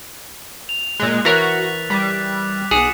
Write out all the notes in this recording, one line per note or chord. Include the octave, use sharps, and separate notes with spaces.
F7
A#2 G#3 E6 F#6
E3 F#4 A#4 C#5 F#6 A6 B6
G3 D6 B6
B1 G#4 F#5 D#6 C#7 E7